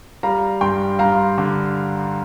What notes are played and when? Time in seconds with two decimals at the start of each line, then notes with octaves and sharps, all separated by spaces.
0.23 G3 F5 A#5
0.61 G2 G5 C6
0.99 G2 F5 A#5
1.38 D3